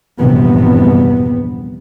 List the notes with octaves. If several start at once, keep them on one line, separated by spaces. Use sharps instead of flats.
A#1 E2 G2 C3 B3